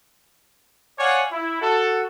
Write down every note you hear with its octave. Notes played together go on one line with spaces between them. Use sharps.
C#5 D5 F5 F#5 G#5
E4
F#4 A4